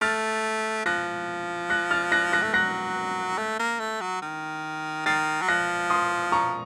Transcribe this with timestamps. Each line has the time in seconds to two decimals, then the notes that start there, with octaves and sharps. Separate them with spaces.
0.01 A3 F6 A6
0.86 F3 F#6 A#6
1.70 F#6 A#6
1.91 F6 A6
2.12 F#6 A#6
2.32 F#6 A#6
2.42 A3
2.54 F#3 F#6 A#6
3.38 A3
3.59 A#3
3.80 A3
4.01 F#3
4.22 D#3
5.06 D#3 A6 C7
5.42 F#3
5.48 F3 F#6 A#6
5.90 C6 D#6
6.32 A#5 C#6